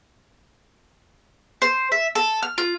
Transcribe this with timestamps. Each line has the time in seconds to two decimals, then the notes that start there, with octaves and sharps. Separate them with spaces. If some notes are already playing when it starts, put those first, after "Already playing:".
1.62 C5
1.92 E5
2.15 A4
2.43 F6
2.58 F4